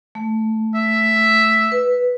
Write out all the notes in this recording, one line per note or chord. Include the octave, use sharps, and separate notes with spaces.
A3
E5
B4